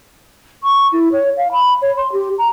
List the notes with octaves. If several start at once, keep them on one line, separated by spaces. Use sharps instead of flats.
C#6
E4
C#5
F5
B5
C#5
C6
G4
A#5